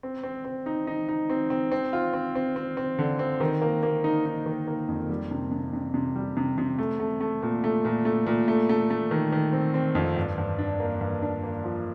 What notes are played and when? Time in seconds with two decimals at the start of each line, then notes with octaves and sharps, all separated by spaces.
0.03 C4
0.24 C4
0.45 C4
0.66 D#4
0.87 D#4
1.09 D#4
1.30 C4
1.50 C4
1.72 C4
1.93 F4
2.14 C4
2.35 C4
2.56 C4
2.77 C4
2.99 D3
3.19 C4
3.40 D#3
3.62 A#3
3.83 A#3
4.04 D#4
4.26 D#4
4.46 D#3
4.67 A#3
4.88 F2
5.09 G3
5.31 C3
5.52 C3
5.73 C3
5.94 C3
6.16 G3
6.37 C3
6.58 C3
6.79 A3
7.00 A3
7.21 A3
7.43 A#2
7.64 A3
7.85 A#2
8.05 A3
8.27 A#2
8.48 A3
8.69 A3
8.90 A3
9.11 D#3
9.32 D#3
9.53 C4
9.74 C4
9.95 F2
10.16 G2
10.38 G2
10.59 D4
10.80 A#3
11.01 G2
11.22 D4
11.43 A#3
11.64 F3